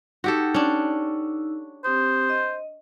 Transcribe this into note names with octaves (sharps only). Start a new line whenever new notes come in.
D#4 F#4 G4 A4 E6
C#4 D4
C4 G4 C5 D#6
D#5